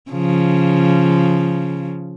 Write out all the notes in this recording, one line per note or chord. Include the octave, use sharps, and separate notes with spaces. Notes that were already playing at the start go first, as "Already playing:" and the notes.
C#3 F3